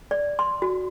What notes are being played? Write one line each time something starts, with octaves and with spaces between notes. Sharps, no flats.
D5
C6
F#4